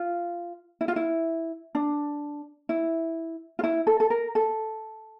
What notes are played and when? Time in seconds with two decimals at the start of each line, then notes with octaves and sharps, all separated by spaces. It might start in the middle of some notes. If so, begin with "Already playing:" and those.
Already playing: F4
0.81 E4
0.88 F4
0.96 E4
1.75 D4
2.69 E4
3.59 F4
3.64 E4
3.87 A4
4.00 A4
4.10 A#4
4.35 A4